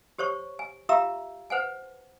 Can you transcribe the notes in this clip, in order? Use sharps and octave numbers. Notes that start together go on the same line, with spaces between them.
G4 C5 C#5 C#6
G#5
F4 G4 E5 F5 A#5 E6
B4 C5 F#5 G#5